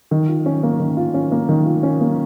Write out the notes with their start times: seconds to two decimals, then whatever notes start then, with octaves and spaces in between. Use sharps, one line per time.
0.11 D#3
0.28 F4
0.46 C#4
0.63 A#3
0.80 D#3
0.97 F4
1.14 C#4
1.32 A#3
1.49 D#3
1.66 F4
1.83 C#4
2.01 A#3